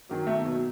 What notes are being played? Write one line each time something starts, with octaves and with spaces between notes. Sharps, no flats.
F#2 D#3 F#3
B1 A3
B2 F#3